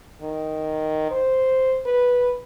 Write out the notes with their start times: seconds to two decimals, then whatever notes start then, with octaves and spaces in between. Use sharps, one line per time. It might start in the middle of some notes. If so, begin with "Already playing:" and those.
0.22 D#3
1.11 C5
1.86 B4